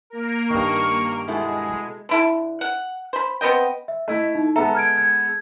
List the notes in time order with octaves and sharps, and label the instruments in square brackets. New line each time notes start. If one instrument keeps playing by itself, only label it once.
[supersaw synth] A#3 A#4
[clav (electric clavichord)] G2 D#3 [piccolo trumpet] C#6
[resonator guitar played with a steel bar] B2 A3 E4 [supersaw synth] G#3 [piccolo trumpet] G#4
[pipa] D3 E4 A4
F#5
C5 B5
B3 C4 D#5 G5
[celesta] E5
[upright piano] A3 E4 [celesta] D#5
[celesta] D#4
[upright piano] G#3 B3 A4 [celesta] E5 A#5
[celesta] F6 G#6 D7
G#6